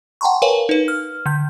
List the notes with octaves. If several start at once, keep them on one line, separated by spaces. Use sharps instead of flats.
F#5 G5 A5 A#5 C6 C#6
A#4 B4 C#5 F5 G#5
D#4 B4
F6
D3 G6